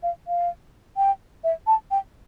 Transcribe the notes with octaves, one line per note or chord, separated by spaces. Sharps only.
F5
F5
G5
E5
A5
G5